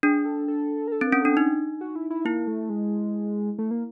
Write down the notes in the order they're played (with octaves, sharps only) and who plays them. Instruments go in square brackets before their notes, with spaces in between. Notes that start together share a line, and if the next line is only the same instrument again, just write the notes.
[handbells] D4 [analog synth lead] G#4
[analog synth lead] A4
A4
A#4
A4
[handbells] C4
[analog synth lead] A#4
[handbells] C#4
[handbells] D4 [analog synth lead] A4
[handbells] D#4
[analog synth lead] F#4
E4
E4
[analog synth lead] A#3 [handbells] E4
[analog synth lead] A3
G#3
A3
A#3